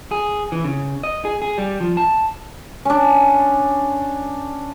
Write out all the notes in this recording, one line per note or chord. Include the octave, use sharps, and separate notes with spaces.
G#4
E3
C#3
D#5
G#4
G#4
G3
F3
A5
C#4 D4